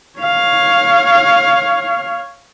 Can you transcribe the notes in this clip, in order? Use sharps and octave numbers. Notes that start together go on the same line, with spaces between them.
C#5 F5